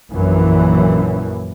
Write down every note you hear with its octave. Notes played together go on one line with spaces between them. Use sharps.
A#1 F#2 E3